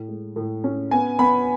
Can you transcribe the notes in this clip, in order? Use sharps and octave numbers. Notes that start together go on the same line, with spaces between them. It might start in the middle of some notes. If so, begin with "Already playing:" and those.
Already playing: A2
G#3
A2
C#4
B3 G#5
B3 B5